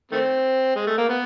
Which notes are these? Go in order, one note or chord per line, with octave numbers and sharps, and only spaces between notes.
D#3 A3 C4
G#3
A3
A#3
B3